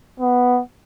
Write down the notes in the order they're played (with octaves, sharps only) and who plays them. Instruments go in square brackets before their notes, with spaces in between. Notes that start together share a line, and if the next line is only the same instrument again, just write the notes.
[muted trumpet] B3